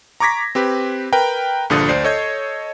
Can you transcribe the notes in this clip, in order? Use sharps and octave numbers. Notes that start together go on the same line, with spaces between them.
A#5 C#6 D6 G#6 A#6 B6
C4 G4 B4
A#4 B4 G5 A#5
A#1 G2 D3 F3 D#6 A6
D2 C5 D5 C7
A4 C#5 D#5 G6 G#6